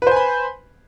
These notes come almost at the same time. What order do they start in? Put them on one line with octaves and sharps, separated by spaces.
B4 C5 G#5 B5